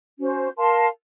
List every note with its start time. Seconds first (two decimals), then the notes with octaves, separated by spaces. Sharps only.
0.19 C#4 F#4 C5
0.56 A#4 F5 A5 C6